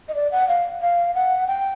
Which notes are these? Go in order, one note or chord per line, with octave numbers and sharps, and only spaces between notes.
D#5
D5
F#5
F5
F5
F#5
G5